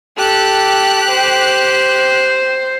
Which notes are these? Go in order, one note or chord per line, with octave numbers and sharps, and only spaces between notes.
G4 A4 F#6
C5